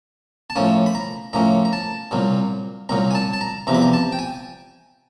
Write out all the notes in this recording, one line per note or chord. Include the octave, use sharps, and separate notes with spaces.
A5
A2 F3 A#3 C#4 G#5
B5
A#5
A2 F3 A#3 C#4 A#5
A#5
A5
C2 A#2 F#3
C2 A#2 F#3 A#5
G#5
A5
A5
A#5
E2 C3 F3 A#5
B5
A#5
A5
G5
G#5